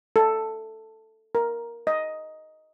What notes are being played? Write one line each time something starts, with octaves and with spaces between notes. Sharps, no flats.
A4
A#4
D#5